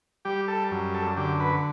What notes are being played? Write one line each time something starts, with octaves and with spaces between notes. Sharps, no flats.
G3 G4
A4
F#2
A4
D3 G4
B4